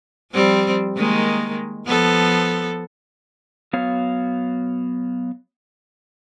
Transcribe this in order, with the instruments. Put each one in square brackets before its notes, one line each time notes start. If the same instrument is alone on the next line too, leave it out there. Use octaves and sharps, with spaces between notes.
[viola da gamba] F3 G3 C4
D#3 G#3 A#3
F3 B3 A4
[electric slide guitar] F#3 B3 C#5 F5